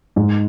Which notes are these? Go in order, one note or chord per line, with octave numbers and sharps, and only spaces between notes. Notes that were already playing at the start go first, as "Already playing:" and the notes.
G#2